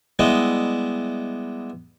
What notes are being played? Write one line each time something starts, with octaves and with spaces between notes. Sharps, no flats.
G3 G#3 B3 E4 D#5 E5